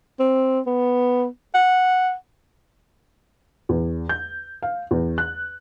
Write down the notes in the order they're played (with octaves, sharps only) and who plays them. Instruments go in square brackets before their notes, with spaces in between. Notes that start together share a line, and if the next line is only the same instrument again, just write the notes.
[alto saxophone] C4
B3
F#5
[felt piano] E2
G6
F5
E2
F#6